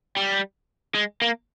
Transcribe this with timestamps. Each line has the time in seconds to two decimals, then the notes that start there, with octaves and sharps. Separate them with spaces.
0.17 G3
0.95 G#3
1.22 A#3